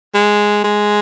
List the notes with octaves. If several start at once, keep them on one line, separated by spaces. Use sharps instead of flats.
G#3
G#3